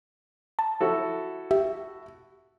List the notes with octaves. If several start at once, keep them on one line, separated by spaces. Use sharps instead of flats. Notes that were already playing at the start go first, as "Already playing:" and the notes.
A5
E4 F#4 A4
G4 E5